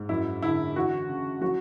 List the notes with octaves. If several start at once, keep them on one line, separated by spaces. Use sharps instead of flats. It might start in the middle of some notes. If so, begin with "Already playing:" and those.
Already playing: G#2
F#2 E4
D3 E4
E3 F#4
C#3
F#3 F#4